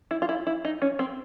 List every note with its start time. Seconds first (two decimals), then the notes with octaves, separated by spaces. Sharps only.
0.11 E4
0.22 F4
0.29 E4
0.47 E4
0.65 D#4
0.82 C#4
0.99 C4